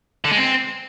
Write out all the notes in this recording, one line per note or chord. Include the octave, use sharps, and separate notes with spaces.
D3
G#3
C4